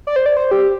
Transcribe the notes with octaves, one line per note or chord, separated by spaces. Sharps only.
D5
C5
D5
C5
G4